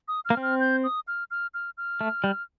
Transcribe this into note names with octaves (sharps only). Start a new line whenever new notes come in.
D#6
F6
A#3
C4
F6
G6
D#6
F6
F6
F6
F6
A3
G3